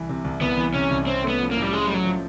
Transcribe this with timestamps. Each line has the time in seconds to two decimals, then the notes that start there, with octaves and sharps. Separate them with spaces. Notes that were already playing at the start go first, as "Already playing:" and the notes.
Already playing: C2 E3
0.09 C3
0.24 C2
0.41 C2 B3
0.57 E3
0.74 C3 C#4
0.91 C2
1.07 C4 C#4
1.23 A3
1.28 B3
1.40 F3
1.51 A#3
1.57 A2
1.62 G3
1.73 G#3 C#4
1.87 G3
1.89 F#3 A3
2.05 F3